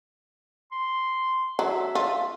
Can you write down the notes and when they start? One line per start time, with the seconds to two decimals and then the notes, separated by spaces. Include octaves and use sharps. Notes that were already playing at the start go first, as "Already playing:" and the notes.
0.72 C6
1.59 F#3 E5
1.95 F4